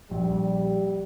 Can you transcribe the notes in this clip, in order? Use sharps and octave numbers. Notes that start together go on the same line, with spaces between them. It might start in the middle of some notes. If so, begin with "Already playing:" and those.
A#1 G3